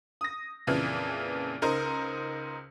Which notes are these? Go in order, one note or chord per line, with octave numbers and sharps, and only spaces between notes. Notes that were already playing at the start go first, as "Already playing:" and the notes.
D#6 A#6
F2 A#2 C#3 E3
C#2 D#4 A#4 C5